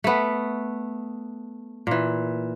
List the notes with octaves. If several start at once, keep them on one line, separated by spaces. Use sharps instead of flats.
A3 B3
A#2 E3